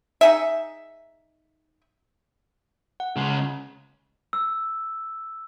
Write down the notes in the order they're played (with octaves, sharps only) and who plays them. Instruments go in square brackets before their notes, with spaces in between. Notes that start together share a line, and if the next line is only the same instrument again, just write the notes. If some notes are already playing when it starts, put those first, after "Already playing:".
[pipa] D#4 G#4 E5
[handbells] F#5
[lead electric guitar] C#3 G#3
[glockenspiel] E6